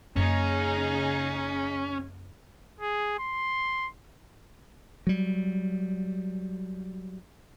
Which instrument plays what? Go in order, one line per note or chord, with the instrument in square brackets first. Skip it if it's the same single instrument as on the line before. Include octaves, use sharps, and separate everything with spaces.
[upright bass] F#2 A#3 [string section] C#3 D#4 G#4 [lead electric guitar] C#4
[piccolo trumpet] G#4
C6
[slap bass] F#3 G3